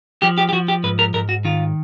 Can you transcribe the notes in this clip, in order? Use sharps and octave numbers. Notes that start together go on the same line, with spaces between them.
F3 G4
G4
G4
F3 F#4
G4
G#2 B4
A#4
G#2 A#4
F#4
D#3 F4